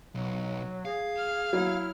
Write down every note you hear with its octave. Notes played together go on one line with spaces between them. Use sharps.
B1 F#3
G#4 F5
F6
F#3 E4